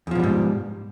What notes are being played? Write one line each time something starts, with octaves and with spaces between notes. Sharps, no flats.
E2 G#2 B2 F3 G3